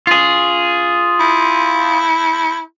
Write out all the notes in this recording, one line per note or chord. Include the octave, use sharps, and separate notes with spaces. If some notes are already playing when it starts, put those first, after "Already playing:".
F4 G#4
E4